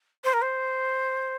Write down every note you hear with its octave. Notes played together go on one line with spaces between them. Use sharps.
C5
A#4
C5